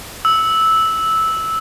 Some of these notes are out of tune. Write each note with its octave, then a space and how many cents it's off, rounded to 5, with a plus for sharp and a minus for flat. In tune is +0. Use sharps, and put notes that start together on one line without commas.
E6 -10